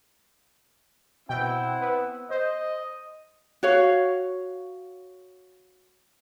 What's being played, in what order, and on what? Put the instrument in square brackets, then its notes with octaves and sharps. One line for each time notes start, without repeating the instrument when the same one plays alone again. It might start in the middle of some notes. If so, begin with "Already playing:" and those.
[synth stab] B2 G5 [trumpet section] C4 E4 F#5
[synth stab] B3
[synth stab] C5 [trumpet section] D#5
[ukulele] F#4 C#5 F5